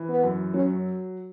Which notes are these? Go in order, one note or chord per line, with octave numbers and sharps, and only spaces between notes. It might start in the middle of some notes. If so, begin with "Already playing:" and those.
Already playing: E3
B3
F#2
F#3 C#4